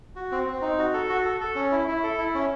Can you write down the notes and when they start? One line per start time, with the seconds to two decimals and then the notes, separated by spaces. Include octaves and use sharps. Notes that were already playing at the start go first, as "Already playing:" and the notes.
0.16 F#4
0.32 C4
0.47 C4
0.62 D#4
0.78 F#4
0.94 A4
1.09 F#4
1.25 A4
1.41 A4
1.55 C#4
1.72 E4
1.88 E4
2.03 A4
2.18 E4
2.35 C#4